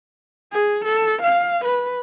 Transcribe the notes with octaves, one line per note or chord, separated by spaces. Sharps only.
G#4
A4
F5
B4